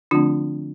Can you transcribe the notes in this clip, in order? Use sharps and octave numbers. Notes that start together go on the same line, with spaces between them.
D3 F3 A3 C4 D4 F4